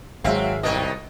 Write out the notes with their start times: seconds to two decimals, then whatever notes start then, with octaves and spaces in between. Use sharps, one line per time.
0.24 G#1 F#3 G#3 C4 E5 F5
0.63 C2 B2 D#3 C#4 D#5